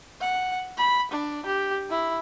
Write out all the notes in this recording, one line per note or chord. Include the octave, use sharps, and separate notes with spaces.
F#5
B5
D4
G4
E4